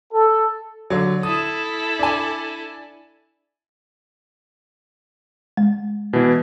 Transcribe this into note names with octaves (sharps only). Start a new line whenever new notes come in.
A4
D3 F#3
E4 A4 D#6
D4 G#5
G#3
B2 E3